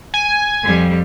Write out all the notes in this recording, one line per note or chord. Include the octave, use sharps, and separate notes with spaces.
G#5
F2 G3